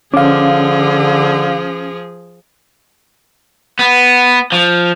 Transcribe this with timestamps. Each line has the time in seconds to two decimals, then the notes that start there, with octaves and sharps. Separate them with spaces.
0.14 D3 F3 C#4 G#4 F5 D6
3.79 B3
4.52 F3